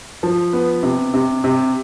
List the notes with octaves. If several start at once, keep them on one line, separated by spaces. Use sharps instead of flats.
F3
B3
C3
C3
C3